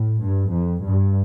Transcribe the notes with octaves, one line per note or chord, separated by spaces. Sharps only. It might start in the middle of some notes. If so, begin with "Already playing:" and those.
Already playing: A2
G2
F2
G2